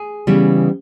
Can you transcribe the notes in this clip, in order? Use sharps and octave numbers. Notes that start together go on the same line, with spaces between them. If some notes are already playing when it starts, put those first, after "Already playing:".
Already playing: G#4
C#3 E3 G3 B3